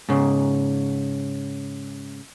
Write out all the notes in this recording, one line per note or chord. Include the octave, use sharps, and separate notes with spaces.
G#2 C#3